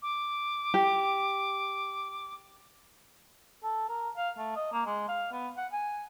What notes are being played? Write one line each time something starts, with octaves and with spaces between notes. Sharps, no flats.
D6
G4
A4
A#4
F5
A3
D#5
A#3
G#3
F5
B3
F#5
G#5